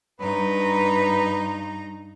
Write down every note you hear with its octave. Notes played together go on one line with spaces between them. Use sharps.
G2 D#4 B4 A#5